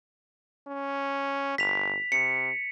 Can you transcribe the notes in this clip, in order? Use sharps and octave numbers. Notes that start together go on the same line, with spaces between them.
C#4
G1 B6 F7
C3 C#7